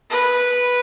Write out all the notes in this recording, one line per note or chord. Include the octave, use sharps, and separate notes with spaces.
B4